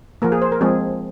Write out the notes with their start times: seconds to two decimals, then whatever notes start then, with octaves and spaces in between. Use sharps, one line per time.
0.22 F3 A#3 A#4
0.32 G#4
0.42 C5
0.52 A#4
0.61 F3 G#3 C4 G#4